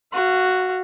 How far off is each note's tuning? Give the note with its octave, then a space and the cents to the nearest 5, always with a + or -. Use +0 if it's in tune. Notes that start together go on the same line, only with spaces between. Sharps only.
F#4 +0 F5 -30